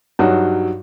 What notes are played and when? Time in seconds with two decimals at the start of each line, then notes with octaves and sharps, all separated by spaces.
0.19 G2 F#3 D#4 F#4